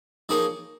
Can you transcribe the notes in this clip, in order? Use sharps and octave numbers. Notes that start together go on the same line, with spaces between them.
F3 A#3 D#4 G#4 C#5